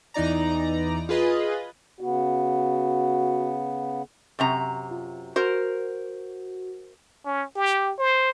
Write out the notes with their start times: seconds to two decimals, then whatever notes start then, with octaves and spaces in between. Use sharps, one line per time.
0.14 E2 E3 D#4 D5 A#5
1.09 F4 G#4 B4 D#5
2.01 C#3 B3 F#4
4.39 F#2 C3 A#5
4.91 F4
5.36 F#4 A#4 C5
7.26 C#4
7.56 G4
7.99 C5